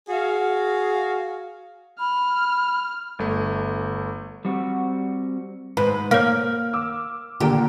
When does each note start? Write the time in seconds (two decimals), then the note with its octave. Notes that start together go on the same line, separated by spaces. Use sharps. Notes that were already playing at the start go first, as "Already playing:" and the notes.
0.09 F#4 G#4 F5
1.99 B5 F6
3.19 G1 A3
4.45 G3 C4 F#4
5.77 G#2 B4
6.11 A#3 C#5 F5 F6
6.73 D6 E6
7.40 A#2 D3 A#3 G4